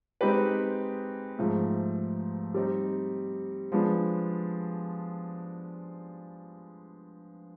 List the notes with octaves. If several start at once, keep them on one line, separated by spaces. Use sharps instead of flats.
G#3 C4 D#4 G4 B4
G#2 F3 A3
G3 C4 D#4
F3 G#3 B3 D4